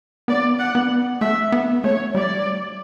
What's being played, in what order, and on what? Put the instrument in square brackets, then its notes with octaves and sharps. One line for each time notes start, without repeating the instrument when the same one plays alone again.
[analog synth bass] B3 [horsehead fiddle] D5
[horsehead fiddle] F#5
[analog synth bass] B3
[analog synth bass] A3 [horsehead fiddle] E5
[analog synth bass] B3
[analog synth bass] A3 [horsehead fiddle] C#5
[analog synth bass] G3 [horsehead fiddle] D5